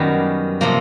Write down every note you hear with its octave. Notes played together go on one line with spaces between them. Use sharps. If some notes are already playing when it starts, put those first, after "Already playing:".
Already playing: F#2 D#3 G3 B3 F#4
C3 F3 A#3